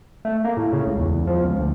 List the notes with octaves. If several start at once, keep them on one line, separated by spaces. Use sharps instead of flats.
A3
A#3
A2
C#3
C#2
E2
E2
F3
C#2
D2